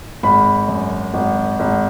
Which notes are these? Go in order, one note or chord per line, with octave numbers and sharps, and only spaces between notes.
G#1 B5
F#2
G#1
G#1